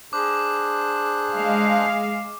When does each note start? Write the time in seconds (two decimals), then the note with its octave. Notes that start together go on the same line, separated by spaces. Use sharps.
0.13 D4 G#4 C5 D6 F#6
1.32 G#3 F5